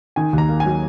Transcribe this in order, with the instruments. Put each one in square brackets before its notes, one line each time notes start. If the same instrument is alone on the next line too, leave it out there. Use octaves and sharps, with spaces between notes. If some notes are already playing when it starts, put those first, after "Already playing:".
[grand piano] D#3 G#5
D#2
A#5
A#3
G#5
F#3